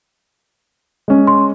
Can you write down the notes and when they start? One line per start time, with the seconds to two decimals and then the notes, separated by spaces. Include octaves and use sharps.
1.08 G#3 C#4
1.27 C6